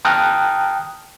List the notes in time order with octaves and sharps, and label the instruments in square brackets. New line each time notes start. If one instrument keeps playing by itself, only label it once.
[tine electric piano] G5 A5 A#5 D#6 F6 F#6